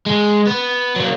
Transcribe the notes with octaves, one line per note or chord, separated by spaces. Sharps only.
G#3
B3
F#3 A#3